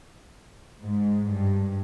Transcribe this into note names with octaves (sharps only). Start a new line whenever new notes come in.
G#2
G2